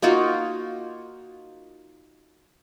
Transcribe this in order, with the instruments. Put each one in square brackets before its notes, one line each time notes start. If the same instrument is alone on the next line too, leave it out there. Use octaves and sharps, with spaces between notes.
[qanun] A#3 D#4 F4 F#4